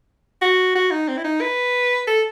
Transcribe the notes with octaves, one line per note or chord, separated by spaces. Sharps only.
F#4
F#4
D#4
C4
E4
D#4
B4
A4